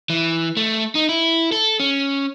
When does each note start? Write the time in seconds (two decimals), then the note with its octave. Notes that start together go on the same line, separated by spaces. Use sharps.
0.10 E3
0.57 A3
0.95 D#4
1.09 E4
1.52 A4
1.79 C#4